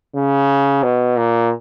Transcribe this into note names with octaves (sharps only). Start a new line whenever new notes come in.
C#3
B2
A#2